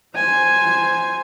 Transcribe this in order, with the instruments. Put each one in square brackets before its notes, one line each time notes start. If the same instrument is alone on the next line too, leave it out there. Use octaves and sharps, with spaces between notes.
[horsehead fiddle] C5 G#5